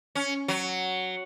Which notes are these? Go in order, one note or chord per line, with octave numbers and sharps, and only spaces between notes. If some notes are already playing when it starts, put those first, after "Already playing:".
C#4
F#3